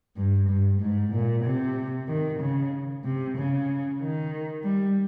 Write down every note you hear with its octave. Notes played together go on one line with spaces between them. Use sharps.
G2
G2
G#2
A#2
C3
D#3
C#3
C3
C#3
D#3
G3